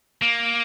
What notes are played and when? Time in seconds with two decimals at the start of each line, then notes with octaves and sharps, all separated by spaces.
0.22 A#3